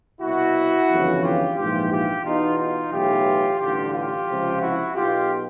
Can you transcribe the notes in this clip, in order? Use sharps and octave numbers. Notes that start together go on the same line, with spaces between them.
C2 B2 E4 F#4
G1 F2 C#3 E3
F4 G4
A#1 G#2 E3 F4 G4
F4 G4
E2 B2 D#4 F4
D#4 F4
B1 A2 E3 F4 G4
A1 G2 D3 F4 G4
F4 G4
C#2 C3 F3
E4 F#4
B1 B2 F4 G4